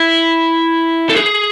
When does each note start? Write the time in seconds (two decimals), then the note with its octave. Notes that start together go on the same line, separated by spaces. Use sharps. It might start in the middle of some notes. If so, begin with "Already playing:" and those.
Already playing: E4
1.09 A4
1.16 G#4